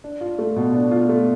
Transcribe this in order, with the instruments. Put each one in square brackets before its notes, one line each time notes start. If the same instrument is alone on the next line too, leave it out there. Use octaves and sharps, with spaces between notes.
[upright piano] D4
F4
A3
B2
D4
F4
A3